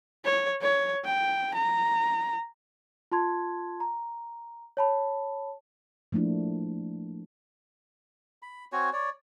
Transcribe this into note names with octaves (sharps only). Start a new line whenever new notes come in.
C#5
C#5
G5
A#5
F4 A5 C6 G#6
A#5
C#5 A5 B5
F3 A3 A#3 D4 E4
B5
C4 F#4 C#5 G#5
C#5 D5